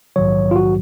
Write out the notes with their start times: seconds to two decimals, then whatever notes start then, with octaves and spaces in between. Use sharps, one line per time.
0.16 A#1 G#2 D#3 F#3 C#5
0.51 F4
0.56 F#4